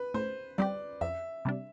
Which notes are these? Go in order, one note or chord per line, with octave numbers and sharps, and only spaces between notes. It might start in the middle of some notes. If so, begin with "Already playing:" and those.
Already playing: B4
A2 C5
G3 C4 G4 D5
F2 E5
C3 G3 D4